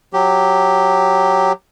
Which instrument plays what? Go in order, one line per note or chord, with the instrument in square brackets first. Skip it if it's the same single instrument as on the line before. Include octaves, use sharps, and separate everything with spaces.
[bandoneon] F#3 G4